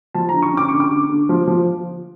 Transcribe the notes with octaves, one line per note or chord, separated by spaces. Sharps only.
F3 A5
D3 A#5
C#6
C#4 D6
D3 C#6
D6
D3
D3
F3
F3